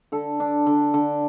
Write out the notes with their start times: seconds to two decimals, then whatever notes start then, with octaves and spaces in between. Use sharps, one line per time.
0.12 D3 A4
0.40 D4
0.67 D3
0.94 D3